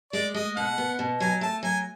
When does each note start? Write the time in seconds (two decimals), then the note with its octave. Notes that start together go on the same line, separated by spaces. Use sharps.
0.13 G#3 D5
0.35 G#3 D#5
0.56 B2 F#5
0.78 B3
0.99 B2
1.20 F#3 G#5
1.41 A3 A5
1.63 F#3 G#5